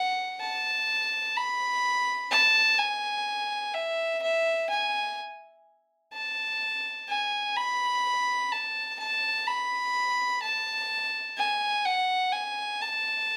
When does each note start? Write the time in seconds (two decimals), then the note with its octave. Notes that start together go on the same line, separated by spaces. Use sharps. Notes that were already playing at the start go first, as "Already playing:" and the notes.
Already playing: F#5
0.41 A5
1.37 B5
2.32 A5
2.79 G#5
3.74 E5
4.22 E5
4.70 G#5
6.14 A5
7.09 G#5
7.56 B5
8.52 A5
8.99 A5
9.47 B5
10.43 A5
11.38 G#5
11.86 F#5
12.33 G#5
12.82 A5